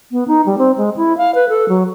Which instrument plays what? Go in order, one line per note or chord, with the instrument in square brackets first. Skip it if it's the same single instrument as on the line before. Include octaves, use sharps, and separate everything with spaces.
[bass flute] B3
D#4
G3
C4
G#3
E4
F5
B4
A4
F#3